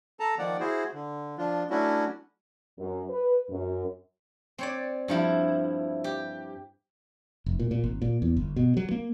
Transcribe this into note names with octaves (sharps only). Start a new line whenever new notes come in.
A4 A5 A#5
D#3 F3 A#3 D5 F#5
E4 F#4 G#4 C5
D3
F3 D4 F4
F#3 A3 C#4 D4 E4 F#4
F#2
B4
F#2
C4 C#5 D5
G2 F3 E4
G4
F1
A#2
A#2
G#1
A#2
E2
G1
B2
F#3
A#3